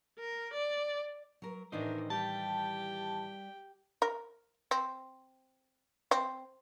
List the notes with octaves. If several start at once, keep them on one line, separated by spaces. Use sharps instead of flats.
A#4
D5
F#3 A#4
A2 D#3 E3 D4 D#4 A#4 C5 D#5
G3 G4 G5 A5
A#4
C4
C4